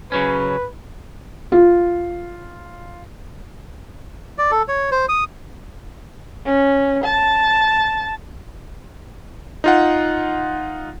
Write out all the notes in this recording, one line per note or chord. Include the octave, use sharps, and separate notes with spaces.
C#3 F#3 C#4 B4
F4
D5
A4
C#5
C5
D#6
C#4
A5
D#4 F4 F#5